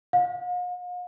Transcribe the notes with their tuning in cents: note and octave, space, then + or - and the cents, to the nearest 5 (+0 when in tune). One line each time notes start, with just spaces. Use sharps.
F5 +45